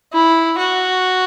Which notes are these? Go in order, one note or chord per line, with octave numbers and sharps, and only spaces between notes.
E4
F#4